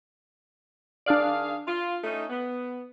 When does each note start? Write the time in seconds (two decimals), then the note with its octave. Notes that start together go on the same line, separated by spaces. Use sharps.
1.06 D#3 D4 G#4 D5 F5
1.67 F4
2.04 A3 C#4 D#4
2.30 B3